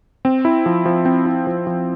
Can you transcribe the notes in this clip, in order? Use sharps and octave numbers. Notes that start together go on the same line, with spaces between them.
C4
E4
F3
F3
C4
E4
F3
F3